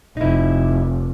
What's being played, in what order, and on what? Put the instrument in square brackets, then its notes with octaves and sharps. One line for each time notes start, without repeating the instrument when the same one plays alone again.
[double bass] F1 [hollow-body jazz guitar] D#4 E4